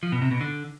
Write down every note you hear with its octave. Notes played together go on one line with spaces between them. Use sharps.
F3
B2
C3
B2
D3